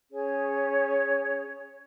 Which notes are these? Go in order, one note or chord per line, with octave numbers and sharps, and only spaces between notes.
C#4 G#4 C#5